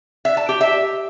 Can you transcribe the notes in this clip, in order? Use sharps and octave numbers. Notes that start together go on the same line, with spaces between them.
E5
A5
G4
E5